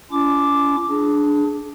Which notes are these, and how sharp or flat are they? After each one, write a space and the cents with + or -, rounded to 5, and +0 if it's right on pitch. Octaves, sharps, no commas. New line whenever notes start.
C#4 +40 F4 -40 D6 +0
D4 +0 G#4 +25